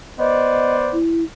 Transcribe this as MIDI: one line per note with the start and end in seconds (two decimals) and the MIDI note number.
0.19 0.99 59
0.19 0.99 72
0.19 0.99 74
0.19 0.76 75
0.93 1.23 64